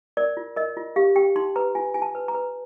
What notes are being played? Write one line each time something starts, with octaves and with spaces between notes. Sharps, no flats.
A#4 D5
F4
A#4 D#5
F4
G4 F5
G4 G5
D#4 C6
B4 A#5
F4 G#5
F4 G#5
A5
B4
A#5
B4